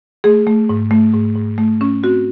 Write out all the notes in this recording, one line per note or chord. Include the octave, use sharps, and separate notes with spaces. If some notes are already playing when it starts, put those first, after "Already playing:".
A3 G#4
A3
G#2
A3
G#2
G#2
A3
C#4
C4 F#4